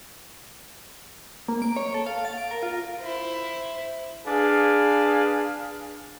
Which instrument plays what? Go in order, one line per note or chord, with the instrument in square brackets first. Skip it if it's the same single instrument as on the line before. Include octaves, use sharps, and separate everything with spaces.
[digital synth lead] A#3
D7
C#5
A4
F5
A6
D7
A#4
F4
[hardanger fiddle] E4 C5
[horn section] D4 G#4 B4 F5